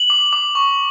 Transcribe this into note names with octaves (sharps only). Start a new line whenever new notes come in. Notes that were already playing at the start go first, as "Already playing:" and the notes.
Already playing: F#7
D6
D6
C#6